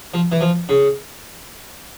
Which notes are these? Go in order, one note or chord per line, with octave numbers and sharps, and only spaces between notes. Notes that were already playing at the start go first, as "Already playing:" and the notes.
F3
E3
F3
C#3